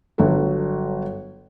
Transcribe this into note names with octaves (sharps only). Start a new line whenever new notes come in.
G1 F#3 F#4 A4